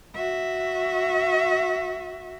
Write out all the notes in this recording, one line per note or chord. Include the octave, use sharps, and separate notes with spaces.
F#4 E5